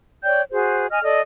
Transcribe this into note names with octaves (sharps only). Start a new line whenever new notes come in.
C#5 D5 G5 G6
F#4 G#4 C5
D#5 G#5 F6
A4 D5 D#5